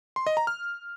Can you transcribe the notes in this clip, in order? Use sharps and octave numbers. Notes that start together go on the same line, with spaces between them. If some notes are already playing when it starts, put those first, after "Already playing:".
C6
D#5
A#5
F6